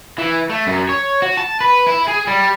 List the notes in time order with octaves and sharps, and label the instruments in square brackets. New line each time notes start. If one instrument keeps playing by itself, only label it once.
[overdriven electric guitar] E3
A3
F#2
C#5
F#4
A5
B4
E4
G#4
G3